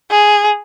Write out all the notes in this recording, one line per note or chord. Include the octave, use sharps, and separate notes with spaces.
G#4